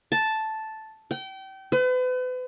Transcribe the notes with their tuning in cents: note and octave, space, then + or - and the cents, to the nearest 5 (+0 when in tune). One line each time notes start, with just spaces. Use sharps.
A5 -5
G5 -30
B4 +40